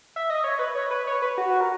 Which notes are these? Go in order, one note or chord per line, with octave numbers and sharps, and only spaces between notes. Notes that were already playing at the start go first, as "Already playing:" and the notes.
E5
D#5
C#5
B4
C#5
B4
C#5
B4
F#4
A#4